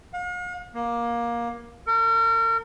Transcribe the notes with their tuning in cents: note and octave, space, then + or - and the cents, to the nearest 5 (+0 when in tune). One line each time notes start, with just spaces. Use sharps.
F5 +45
A#3 +15
A#4 -40